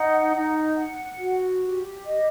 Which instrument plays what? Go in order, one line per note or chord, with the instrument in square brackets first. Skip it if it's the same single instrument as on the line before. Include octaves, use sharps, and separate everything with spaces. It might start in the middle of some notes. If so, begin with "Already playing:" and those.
Already playing: [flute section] D#4 F#5
D#4
F#5
F#4
G4
D#5